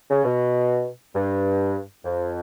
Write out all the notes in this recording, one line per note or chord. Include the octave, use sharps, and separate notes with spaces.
C#3
B2
G2
F2